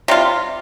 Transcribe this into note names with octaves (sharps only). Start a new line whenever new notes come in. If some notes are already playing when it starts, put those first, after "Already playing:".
C3 G3 F4